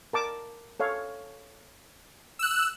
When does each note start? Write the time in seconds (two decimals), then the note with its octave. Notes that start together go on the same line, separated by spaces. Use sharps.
0.13 A#4 A5 D6
0.80 A4 C#5 F5
2.39 E6 F#6